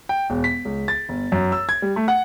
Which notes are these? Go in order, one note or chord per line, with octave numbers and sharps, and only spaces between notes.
G5
E1
B6
C#2
A6
G1
F#2
E6
G#6
G3
A3
F#5